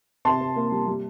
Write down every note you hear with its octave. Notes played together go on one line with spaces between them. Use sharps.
C3 A5 C6
C3
A#3
G3
G3